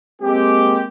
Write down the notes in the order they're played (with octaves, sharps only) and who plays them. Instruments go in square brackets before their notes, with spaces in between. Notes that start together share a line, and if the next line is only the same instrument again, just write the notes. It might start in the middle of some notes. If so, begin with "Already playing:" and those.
[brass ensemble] G#3 A#3 C4 G4